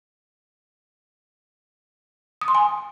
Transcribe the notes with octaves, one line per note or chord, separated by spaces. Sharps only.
D#6
C6
G#5